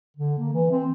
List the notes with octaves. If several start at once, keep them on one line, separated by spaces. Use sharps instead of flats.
D3
A#3
E3
C4